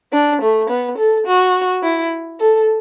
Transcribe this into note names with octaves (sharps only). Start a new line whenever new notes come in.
D4
A3
B3
A4
F#4
E4
A4